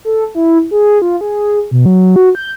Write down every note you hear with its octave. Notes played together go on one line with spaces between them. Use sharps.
A4
E4
G#4
F4
G#4
B2
F#3
F#4
G6